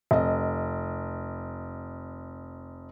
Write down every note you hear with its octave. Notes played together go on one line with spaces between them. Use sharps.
F1 D#5